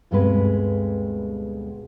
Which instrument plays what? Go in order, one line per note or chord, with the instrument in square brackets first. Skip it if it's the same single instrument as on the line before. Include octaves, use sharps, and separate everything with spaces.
[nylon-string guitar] D2 G2 B2 G#3 C4 B4